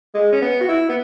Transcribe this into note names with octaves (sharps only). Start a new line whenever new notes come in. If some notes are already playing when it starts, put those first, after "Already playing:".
G#3
C#4
B3
F#4
E4
B3